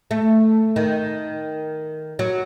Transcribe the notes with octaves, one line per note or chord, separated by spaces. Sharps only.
A3
D#3
F#3